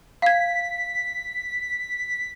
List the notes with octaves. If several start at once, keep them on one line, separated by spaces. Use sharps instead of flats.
F5 G#6 B6